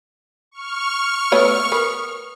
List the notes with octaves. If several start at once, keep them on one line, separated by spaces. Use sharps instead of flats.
C#6 F6
A3 B3 B4 C#5
A#4 B4